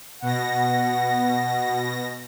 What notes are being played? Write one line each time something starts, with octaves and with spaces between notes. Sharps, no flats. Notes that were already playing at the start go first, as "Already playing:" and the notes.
B2 F#5 A#6